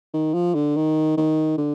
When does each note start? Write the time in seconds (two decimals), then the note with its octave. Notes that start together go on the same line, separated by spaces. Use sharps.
0.14 D#3
0.34 F3
0.55 D3
0.76 D#3
1.17 D#3
1.58 D3